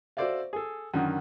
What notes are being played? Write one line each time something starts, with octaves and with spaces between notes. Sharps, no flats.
F#4 A4 C5 D5 E5 F5
G#4 A4
F#2 D3 D#3